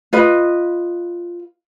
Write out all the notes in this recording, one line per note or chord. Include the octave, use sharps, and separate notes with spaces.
F4 B4 D#5